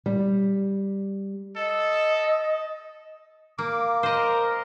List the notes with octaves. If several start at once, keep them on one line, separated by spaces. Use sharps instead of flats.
G3
A4 D#5
A#3 D6
A#4 C5 D#5